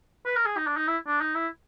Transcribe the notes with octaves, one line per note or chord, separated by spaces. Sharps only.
B4
A#4
G#4
D#4
D4
D#4
E4
D4
D#4
E4